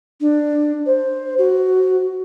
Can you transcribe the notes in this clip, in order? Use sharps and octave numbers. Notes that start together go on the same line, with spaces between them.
D4
C5
F#4